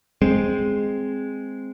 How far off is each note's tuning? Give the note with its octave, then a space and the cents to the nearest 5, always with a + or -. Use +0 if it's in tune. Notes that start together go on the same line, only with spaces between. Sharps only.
G#3 +0 C4 +0